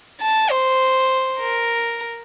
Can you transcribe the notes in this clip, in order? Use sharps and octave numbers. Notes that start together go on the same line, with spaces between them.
A5
C5
A#4